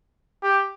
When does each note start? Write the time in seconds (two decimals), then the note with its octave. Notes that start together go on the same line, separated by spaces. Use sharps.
0.43 G4